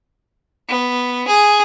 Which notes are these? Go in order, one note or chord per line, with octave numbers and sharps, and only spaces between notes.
B3
G#4